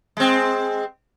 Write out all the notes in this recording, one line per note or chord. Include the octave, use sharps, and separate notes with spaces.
G#3 C4